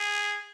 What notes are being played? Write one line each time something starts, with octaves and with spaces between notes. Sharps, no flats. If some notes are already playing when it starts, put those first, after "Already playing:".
Already playing: G#4